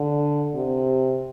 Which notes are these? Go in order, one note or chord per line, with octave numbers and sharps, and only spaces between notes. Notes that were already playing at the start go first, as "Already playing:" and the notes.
Already playing: D3
C3